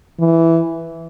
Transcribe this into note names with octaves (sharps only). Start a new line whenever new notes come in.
E3